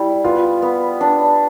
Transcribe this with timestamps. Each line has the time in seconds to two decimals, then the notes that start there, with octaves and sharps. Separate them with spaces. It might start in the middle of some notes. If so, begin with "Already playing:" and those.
Already playing: G3 E4
0.24 B3 F4
0.62 B3
1.01 D4